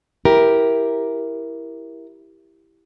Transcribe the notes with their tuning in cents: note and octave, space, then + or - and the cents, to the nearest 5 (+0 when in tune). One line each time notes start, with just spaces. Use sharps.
E4 +0 G4 +0 A#4 +10